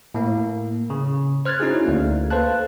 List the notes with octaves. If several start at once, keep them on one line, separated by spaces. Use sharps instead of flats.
A2 A#3
C#3
C5 F6 F#6 G#6 A6
C#4 D#4 E4 F#4 G#4
D2 A#3
A4 B4 C5 F5 A5 F#6